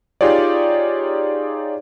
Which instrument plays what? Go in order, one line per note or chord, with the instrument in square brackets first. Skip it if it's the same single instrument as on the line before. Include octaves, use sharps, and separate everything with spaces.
[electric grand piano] D#4 F4 G4 G#4 C#5 D5